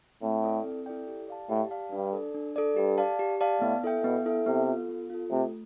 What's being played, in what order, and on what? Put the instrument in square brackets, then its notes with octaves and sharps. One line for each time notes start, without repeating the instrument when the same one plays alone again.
[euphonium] A2 [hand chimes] C4
[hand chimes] E4 A4 D5 G5
C4
E4 A4 D5 G5
G4
D5 F5 A5
[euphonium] A2 [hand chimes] G4
[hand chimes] D5 F5 A5
[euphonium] G2 [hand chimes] D4
[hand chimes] A4 D5
D4
A4 D5
[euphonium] G2 [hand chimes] G4
[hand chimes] D5 F5 A5
G4
D5 F5 A5
[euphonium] A2 [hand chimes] B3
[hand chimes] E4 A4 E5 G5
[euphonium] B2 [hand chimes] B3
[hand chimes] E4 A4 E5 G5
[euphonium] C3 [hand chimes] B3
[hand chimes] F4 A4
B3
F4 A4
[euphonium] C3 [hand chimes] A3